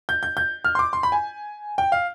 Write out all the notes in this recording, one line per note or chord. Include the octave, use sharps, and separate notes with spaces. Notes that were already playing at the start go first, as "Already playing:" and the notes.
G6
G6
G6
F6
C6
D6
C6
B5
G#5
G5
F5